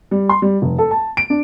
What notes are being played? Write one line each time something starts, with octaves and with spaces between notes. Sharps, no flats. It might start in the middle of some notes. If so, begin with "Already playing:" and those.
G3
C6
G3
F1
A4
A5
D7
D4